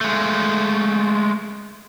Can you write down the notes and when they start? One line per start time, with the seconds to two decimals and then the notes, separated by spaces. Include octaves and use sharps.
0.01 G#3 A3